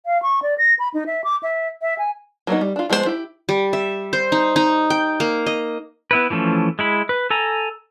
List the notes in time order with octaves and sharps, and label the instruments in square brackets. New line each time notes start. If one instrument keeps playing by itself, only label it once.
[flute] F5
C#6
D5
A#6
B5
D#4
E5
D6
E5
E5
G#5
[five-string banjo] F#3 A#3 B3 D#4
G3
D4 F4
F3 G#3 B3 D4 C5
E4 G4
[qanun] G3
E5
C5
D#4
D#4
G5
A#3
D#5
[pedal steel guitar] B3 E4 B4
E3 F3 A3 C#4
G#3 E4 B5
B4
A4 G#5 A#5